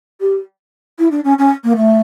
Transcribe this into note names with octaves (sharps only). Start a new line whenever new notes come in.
G4
E4
D4
C#4
C#4
A#3
A3